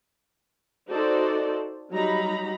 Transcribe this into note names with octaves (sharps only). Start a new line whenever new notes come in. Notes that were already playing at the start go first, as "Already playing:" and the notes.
D#4 F#4 A4 C5 D5
F#3 G3 D#4 A#5 B5